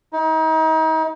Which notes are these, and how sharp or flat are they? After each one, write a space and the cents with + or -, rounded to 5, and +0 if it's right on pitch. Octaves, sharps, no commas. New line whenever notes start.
D#4 +35